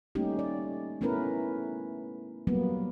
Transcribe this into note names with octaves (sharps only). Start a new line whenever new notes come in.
G3 A3 A#3 C#4 D#4 G4
D5
A3 B3 C#4 E4 A#4 B4
F#3 G3 A#3 B3